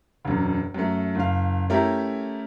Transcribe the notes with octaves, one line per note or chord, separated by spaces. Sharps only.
E1 F#2
F#2 A3
F#1 F5
A3 C#4 E4 G4 A#4